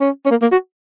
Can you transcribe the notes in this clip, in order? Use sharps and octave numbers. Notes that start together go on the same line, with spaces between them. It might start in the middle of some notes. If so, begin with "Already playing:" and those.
C#4
C#4
A#3
A#3
F#4